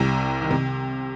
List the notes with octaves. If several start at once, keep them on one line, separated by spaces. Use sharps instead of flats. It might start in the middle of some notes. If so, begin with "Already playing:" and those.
Already playing: C2 C3
D#3
C3